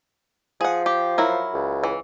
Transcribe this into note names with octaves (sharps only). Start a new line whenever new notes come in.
F3 G#4 F#5
G4
F#3 E4 A#4
C#2
E3